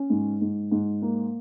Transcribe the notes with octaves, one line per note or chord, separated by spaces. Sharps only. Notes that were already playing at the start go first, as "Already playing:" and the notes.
Already playing: C#4
G#2
G#2
G#2
A#3